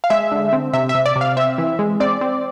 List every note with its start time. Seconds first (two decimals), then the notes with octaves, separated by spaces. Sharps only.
0.04 F5
0.10 G#3 E5
0.32 D3
0.53 C4
0.73 C3 E5
0.89 E5
0.95 C3
1.06 D5
1.16 C3
1.21 F5
1.37 C4 E5
1.58 E3
1.79 G#3
2.00 C4 D5
2.21 C4